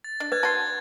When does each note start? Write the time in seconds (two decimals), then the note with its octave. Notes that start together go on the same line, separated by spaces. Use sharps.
0.04 A6
0.20 D4
0.32 B4 F#6 G#6 A6
0.43 F#4 A5 C6